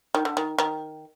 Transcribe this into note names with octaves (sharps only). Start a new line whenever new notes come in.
D#3
D3
D#3
D#3